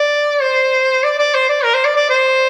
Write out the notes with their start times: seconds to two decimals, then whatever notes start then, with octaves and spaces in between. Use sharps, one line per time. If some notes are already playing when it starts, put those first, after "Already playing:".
Already playing: D5
0.42 C5
1.04 D5
1.19 D5
1.35 C5
1.49 D5
1.64 A#4
1.74 C5
1.85 D5
1.96 D5
2.10 C5